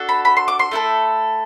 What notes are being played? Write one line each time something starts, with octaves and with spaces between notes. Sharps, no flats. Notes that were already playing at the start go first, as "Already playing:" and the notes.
Already playing: D4 F#4 A4
B5
B5
C6
D6
C6
A3 E4 A4